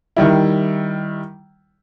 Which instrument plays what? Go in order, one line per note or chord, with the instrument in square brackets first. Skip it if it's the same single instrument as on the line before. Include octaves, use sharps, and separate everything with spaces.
[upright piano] D#3 G3 E4